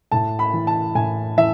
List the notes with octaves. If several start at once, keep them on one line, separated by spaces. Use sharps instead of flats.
A2 A5
B5
E3
A5
A2 G#5
E3 E5